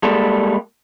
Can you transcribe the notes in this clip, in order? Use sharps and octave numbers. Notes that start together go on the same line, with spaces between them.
G3 G#3 A#3 A4